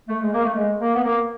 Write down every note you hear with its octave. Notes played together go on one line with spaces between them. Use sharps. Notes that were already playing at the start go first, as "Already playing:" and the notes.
A3
G#3
A#3
A3
G#3
A#3
B3
A#3